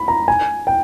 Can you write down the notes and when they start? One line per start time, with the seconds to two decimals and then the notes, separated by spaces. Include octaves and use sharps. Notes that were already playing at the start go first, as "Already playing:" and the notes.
Already playing: B5
0.08 A#5
0.28 G#5
0.67 G5